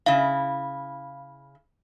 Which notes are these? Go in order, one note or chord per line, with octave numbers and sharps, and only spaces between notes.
C#3 E4 F5